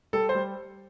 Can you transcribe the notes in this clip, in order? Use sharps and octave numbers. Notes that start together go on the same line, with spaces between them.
G3 A4
C5
G3